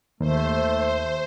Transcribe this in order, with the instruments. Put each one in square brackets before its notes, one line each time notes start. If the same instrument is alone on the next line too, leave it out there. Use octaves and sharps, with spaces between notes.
[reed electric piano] D#2 [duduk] A3 [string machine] C5